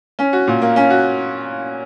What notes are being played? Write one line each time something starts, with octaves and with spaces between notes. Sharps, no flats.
C#4
F#4
A#2
A#3
C#4
F#4